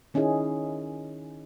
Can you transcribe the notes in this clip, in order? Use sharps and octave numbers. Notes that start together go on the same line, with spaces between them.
D#3 C#4 D#4 E4 G#4